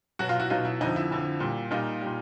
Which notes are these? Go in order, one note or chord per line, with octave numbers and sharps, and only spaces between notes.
B2 F#3 F#4
F4
E4 F#4
B2 F#3 D#4 F4
E4
F2 D3 F3 D#4
E4
F2 D3 F3
A#2 G3
A#2 G3 D#4 F4
G3
A#2